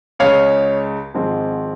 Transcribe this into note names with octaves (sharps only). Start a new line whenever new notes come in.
C#2 C#3 G#3 C#5 F5
G#1 G#2 F3 G#3 C4